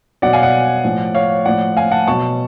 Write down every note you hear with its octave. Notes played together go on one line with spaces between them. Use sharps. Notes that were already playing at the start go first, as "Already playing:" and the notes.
B2 F#3 D5 F#5
F5 G#5
D5 F#5
A2 F3
C#5 F5
A2 F3 D5 F#5
F5 G#5
F#5 A5
B2 F#3 A5 C#6